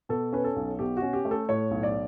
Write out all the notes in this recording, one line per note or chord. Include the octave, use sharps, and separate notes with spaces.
B2 A4
C#4 B4
A4
B1
B2 G4
F#4
C#4
G4
A3
A4
A2 C#5
B1
D5